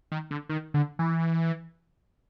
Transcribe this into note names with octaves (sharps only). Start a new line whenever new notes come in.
D#3
D3
D#3
D3
E3